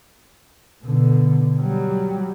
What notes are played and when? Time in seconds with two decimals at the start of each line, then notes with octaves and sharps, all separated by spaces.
0.83 B2 D3
1.59 F#3 G3